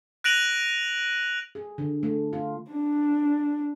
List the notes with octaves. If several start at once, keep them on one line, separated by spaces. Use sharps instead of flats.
F#6 A#6 D7 D#7 F7 F#7
G#4
D3
A3
F4
D4